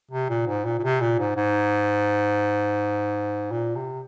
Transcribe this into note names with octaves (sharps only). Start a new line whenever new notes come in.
C3
A#2
G#2
A#2
A#2
C3
A#2
G#2
G#2
A#2
C3